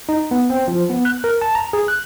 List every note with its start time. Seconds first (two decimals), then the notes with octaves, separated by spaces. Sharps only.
0.09 D#4
0.31 B3
0.50 C4
0.68 F3
0.90 B3
1.05 F#6
1.24 A#4
1.41 A5
1.55 A#5
1.73 G#4
1.88 F#6